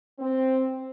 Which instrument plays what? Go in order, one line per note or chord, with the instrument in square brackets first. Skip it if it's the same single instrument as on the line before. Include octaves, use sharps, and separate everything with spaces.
[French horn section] C4